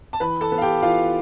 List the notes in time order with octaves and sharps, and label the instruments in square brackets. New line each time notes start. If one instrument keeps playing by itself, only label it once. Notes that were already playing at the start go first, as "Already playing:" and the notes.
[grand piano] A5
E3 B4 B5
A4 A5
B3
F5
G4 G5
E3 F4 F5